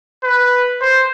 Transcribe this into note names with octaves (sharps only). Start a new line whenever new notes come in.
B4
C5